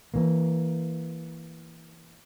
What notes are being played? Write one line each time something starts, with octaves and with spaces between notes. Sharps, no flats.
E3 A#3